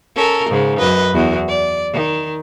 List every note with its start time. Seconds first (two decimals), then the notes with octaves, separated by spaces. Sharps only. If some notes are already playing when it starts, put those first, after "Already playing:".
0.16 C#4 A4 A#4
0.50 G#2 C#3
0.79 F#2 B4 D#5
1.14 E2 F#4
1.48 D5
1.93 D#3